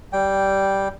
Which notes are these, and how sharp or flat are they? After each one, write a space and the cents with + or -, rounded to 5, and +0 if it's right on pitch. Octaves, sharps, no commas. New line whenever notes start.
G3 -10 G5 +0